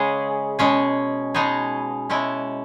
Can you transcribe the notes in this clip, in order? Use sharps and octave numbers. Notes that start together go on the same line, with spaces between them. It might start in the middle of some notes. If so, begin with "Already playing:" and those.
Already playing: C#3 G#3 C#4 G#4
B2 G#3 C#4 G#4
B2 G#3 D#4 G#4
B2 G#3 C#4 E4